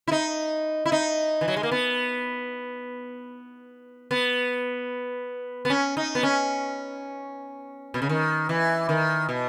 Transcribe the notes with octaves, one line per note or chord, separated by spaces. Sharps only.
E4
D#4
E4
D#4
E3
F#3
G#3
A#3
B3
B3
B3
C#4
D#4
B3
C#4
B2
C#3
D#3
E3
D#3
B2